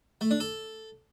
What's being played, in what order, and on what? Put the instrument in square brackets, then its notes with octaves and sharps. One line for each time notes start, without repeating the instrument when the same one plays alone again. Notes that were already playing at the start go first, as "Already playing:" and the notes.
[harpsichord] A3
D4
A4